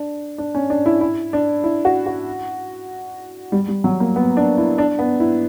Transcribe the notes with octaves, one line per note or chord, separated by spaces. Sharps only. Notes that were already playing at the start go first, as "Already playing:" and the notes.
Already playing: D4
D4
C#4
D4
E4
E4
D4
E4
F#4
F#4
G3
G3
F#3
A#3
B3
D4
E4
D4
B3
E4